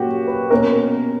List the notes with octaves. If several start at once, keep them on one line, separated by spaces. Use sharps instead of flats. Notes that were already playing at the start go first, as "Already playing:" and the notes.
Already playing: A#2 F#3 A#3 C#4 F#4 G4
B4
B2 A#3 C#4 A#4